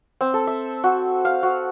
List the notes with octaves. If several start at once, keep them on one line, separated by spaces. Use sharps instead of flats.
C4
A4
E5
F#4
F5
F#4